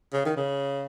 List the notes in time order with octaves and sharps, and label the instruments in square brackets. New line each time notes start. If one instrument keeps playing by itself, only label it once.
[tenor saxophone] C#3
D#3
C#3